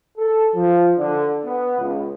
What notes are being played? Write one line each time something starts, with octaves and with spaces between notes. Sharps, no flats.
A4
F3
D3
B3
C#2